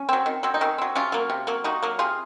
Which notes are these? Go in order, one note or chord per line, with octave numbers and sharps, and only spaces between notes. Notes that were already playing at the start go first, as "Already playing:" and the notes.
Already playing: C#4
F#3 C4
D#3
F#3 C4
D#4
D#3 C#4
F#3 C4
C3 C#4 F4
F#3 A#3
C3
F#3 A#3
C3 D#4 F#4
F#3 A#3
C3 F4 G#4